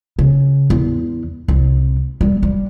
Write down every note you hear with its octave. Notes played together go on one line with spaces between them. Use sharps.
C#3
E2
C2
G3
G3